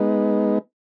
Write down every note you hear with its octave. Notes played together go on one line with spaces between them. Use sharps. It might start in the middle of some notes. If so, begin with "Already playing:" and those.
Already playing: G#3 B3 D#4